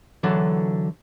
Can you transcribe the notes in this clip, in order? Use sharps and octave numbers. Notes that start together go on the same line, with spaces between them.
D3 E3 F#3 A4